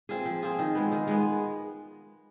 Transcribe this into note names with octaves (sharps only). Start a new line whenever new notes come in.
C4 F4 G#4
F3
C4 F4 G#4
D#3
G#3 B3
D#3
G#3 B3